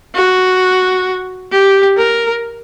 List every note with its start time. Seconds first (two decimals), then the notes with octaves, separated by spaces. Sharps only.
0.15 F#4
1.52 G4
1.97 A#4